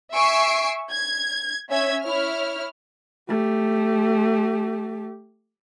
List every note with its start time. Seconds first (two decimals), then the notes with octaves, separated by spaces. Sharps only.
0.14 E5 G#5 C#6 E6 C7 D7
0.91 G#6
1.70 C#4 E5 G#6
2.03 E4 C#5 F6
3.29 A3 G4